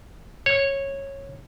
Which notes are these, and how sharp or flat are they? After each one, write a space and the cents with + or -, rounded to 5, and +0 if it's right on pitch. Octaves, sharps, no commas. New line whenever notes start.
C#5 -15